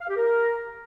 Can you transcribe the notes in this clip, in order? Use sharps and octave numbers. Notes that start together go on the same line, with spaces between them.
F5
G4
A#4